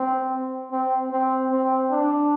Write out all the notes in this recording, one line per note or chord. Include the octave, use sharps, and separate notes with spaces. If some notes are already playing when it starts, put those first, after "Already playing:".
Already playing: C4
C4
C4
C4
D4